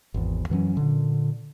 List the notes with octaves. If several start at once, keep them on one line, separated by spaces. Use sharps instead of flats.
G#1 E2
F#2 E3 F#3 C#4
A#2 D3